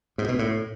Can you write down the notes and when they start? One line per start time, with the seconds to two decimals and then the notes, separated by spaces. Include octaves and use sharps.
0.18 G#2
0.29 B2
0.39 A2